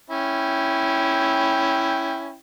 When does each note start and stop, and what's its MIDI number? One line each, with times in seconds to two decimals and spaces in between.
0.10 2.36 61
0.10 2.36 64
0.10 2.36 79